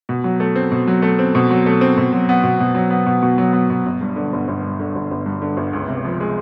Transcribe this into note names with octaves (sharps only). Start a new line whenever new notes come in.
B2
F#3
A3
C4
B2
F#3
A3
C4
B2
F#3
A3
C4
B2
F#3
B3
B2
B2
F#3
B3
B2
B2
F#3
B3
B2
G1
G2
D3
G1
G1
G2
D3
G1
G1
G2
D3
G1
C#2
C3
F3
G#3